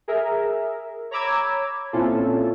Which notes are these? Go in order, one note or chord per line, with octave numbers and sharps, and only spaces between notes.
G#4 A#4 E5
C#5 A#5 B5 D6 E6 G#6
A#2 C4 C#4 E4 F4 A4